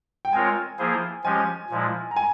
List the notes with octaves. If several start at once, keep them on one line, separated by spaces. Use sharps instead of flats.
G5
G#3 C4 F4 A#4 C#5 G#5
F3 A#3 E4 G#4 C5
F3 G#3 C#4 G4 G#5
A#2 F3 G#3 E4
A#5
G#5